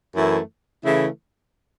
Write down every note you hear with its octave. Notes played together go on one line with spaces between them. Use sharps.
F#2 E3 A3 E4
C#3 E3 A3 E4